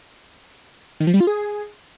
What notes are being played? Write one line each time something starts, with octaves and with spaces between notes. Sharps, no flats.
D#3
F3
G3
F4
G#4